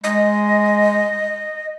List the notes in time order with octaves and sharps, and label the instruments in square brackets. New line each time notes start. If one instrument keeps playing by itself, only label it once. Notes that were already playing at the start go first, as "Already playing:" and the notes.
[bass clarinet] G#3 [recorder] D#5